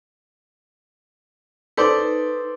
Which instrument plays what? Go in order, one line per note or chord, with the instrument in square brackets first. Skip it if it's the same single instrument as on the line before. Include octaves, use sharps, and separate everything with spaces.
[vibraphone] D#4 B4 [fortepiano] A4 C5 D5